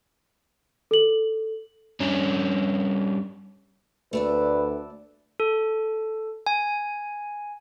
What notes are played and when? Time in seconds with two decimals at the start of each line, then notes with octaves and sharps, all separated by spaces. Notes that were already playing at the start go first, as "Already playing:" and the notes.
0.91 A4 F#7
2.00 G2 C#4
4.13 D2 A3 B4 D5 E5
5.40 A4
6.46 G#5